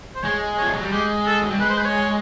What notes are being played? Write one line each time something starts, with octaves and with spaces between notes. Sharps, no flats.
C5
G#3 C#5
F3 C#5
F#3
G3
G#3 G4
A4
F#3
G3
G#3 B4
C5
B4
C#5